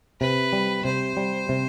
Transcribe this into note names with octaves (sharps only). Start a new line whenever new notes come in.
C3 B4
G3
C3 C5
G3
C3